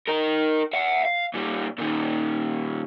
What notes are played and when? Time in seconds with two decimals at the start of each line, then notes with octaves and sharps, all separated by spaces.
0.08 D#4 A#4
0.73 E5 F#5
1.05 F5
1.34 A#2 G3
1.78 A#2 D#3